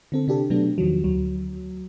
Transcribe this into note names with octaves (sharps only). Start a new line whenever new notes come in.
D3 C4 A4
C3 D4 G4 A4
B2 F#3 A3 B3 D4
E2 D#3 F3 F#3
D2 F#3